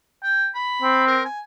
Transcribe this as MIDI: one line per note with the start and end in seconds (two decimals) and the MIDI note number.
0.23 0.47 79
0.55 1.04 83
0.82 1.23 60
1.07 1.23 70
1.25 1.41 80